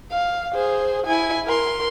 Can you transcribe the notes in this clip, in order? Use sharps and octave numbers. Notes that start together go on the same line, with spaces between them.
F5
G#4 C5
E4 G#5
A#4 C6